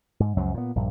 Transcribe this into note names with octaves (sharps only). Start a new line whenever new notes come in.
G#2
C#2 F#2 F3 F#3
A#2 B3
A#1 G2